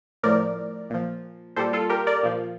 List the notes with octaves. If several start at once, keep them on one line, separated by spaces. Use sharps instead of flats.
A2 F3 A#4 D5
A#2 F3
A#2 G3 A4 C5
F4 A4
G4 A#4
A#4 D5
A#2 F3